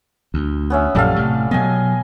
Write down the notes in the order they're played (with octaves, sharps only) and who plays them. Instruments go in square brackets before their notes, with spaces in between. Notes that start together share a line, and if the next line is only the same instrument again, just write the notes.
[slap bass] D2
[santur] B3 C#4 E5
[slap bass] A#1 F#2 A#2 [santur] G3 A4 F5
[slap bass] A2 C3
[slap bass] B2 F#3 B3 [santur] D#5 G#5